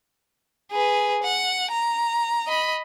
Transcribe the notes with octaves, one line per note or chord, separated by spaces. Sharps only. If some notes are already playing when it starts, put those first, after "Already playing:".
G#4 B4
F#5
A#5
D#5 B5